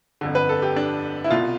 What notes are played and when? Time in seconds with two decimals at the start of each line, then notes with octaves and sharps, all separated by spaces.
0.21 G1 F2 D3
0.35 B4
0.49 A4
0.62 G4
0.76 D4
1.24 E4
1.30 C2 B2 F4